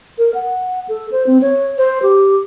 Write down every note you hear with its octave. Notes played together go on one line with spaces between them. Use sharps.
A#4
F#5
A4
C5
C4
C#5
C5
G4